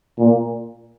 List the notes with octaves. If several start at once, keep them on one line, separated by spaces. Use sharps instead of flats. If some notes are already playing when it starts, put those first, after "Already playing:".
A#2